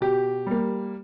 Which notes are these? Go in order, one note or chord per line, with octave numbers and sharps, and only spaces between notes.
B2 G4
G3 A#3